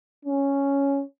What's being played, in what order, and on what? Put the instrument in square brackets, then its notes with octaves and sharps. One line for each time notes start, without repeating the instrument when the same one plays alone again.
[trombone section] C#4